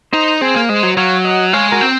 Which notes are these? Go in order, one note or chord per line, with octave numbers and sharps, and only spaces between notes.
D#4 C5 D#5
C4 G#4 C5
A#3
G#3 C5 D#5
F#3
F#3 C#5 F5
D#5 F#5
G#3 C#5 F5
F#4 A#4
C4